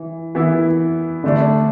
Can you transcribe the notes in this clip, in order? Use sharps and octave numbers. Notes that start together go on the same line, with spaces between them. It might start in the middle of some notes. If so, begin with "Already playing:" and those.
Already playing: E3
E3 B3 E4
D3 A3 D4